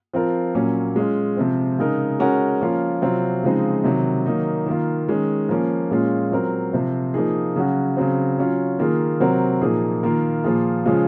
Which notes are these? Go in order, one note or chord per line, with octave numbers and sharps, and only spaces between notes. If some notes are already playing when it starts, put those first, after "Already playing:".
F3 C4 F4 A#4
A#2 F#3 A#3 C#4
G#3 C#4 F4
C3 F3 C4
C#3 G#3 D#4 A#4
G#3 C#4 F#4 A#4
F3 A#3 C#4 F4 A#4
C3 F#3 C4 F4
C#3 F3 G#3 C4 D#4
C3 D#3 F#3
D#3 F#3 A#3 D#4
D#3 A#3 F4
D#3 G#3 C#4
F3 A#3 C#4
A#2 G#3 C#4 F4
F#3 C4 F4 A#4
C3 F3 C4
F3 A#3 D#4 G#4
C#3 F#3 C#4 F#4
C#3 F#3 C4
F#3 C#4 F4
D#3 A#3 F4 G#4
C3 F#3 C4 F#4 A#4
A#2 F3 A#3 D#4 G#4
D#3 A#3 F4 A#4
A#2 F3 A#3 F4 G#4
C#3 F3 G#3 C#4 F4